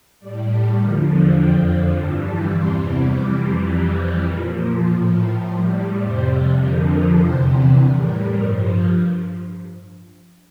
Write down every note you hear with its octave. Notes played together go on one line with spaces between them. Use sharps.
A2 G3 D5
A4
E2 D3 F3 A#4
F2 D3 F3 G5
G2 E3 G3 A5
A5
E2 C3 E3 G3 C6
F2 E3 G3 D6
C6
F2 E3 G3 A#5
C5
A#2 F3 A#4
A#4
A2 F3 A4
A#4
A2 G3 C5
D5
F2 C3 G3 C5
F2 D3 F3 A#4
A#4
E2 C3 E3 C5
A2 G3 A#4
A#4
G2 F3 A#4
C5